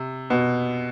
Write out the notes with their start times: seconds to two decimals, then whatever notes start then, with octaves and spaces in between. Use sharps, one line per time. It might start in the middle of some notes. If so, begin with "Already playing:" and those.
Already playing: C3
0.30 B2